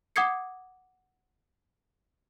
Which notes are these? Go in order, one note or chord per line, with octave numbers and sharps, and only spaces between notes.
F#5 D6 D#6 G#6 C7 C#7